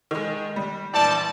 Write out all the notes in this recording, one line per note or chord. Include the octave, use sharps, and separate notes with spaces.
D#3 G#3
G3
A#1 E3 D5 G5 A5